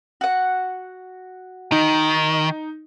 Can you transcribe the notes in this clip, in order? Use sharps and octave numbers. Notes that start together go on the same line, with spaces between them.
F#4 F#5
D#3 D#4